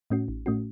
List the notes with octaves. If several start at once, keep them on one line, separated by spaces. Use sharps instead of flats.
A2 A3 C#4 F#4
A1
A2 A3 C#4 F#4